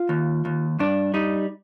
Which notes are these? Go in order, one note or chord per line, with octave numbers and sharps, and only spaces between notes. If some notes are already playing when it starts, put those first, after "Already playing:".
Already playing: F4
D#2
D#2
G2 D4
G3 D#4